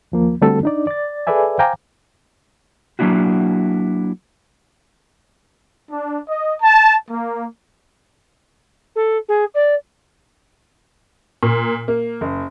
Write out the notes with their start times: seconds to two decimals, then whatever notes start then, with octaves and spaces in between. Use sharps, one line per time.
0.12 D#2 F3 A#3
0.41 D3 G3 A3 C4 F#4 A4
0.63 D4 D#4 D5
0.87 D5 A6
1.27 G#4 A4 B4 D5 E5 G#5
1.59 C5 F5 G5 G#5 A#5 D6
2.99 F#3 A#3 D4 E4 F#4
5.91 D4
6.29 D#5
6.62 A5
7.10 A#3
8.95 A4
9.28 G#4
9.55 D5
11.43 A#2
11.88 A#3
12.21 F#1